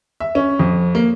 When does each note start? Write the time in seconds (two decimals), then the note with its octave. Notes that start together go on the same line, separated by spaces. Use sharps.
0.20 E5
0.35 C#4
0.59 F2
0.95 A#3